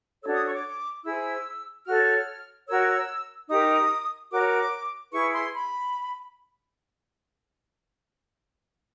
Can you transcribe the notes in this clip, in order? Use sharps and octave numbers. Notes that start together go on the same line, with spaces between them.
D4 F#4 A4 C#5 E6
D#6
C#6
D6
E4 G#4 C5 E6
F#4 A4 C#5 F6
F#4 A#4 C#5 E6
D#4 G4 A#4 D#6
F#4 A#4 C#5 D6
E4 G#4 B4 C#6
C6
B5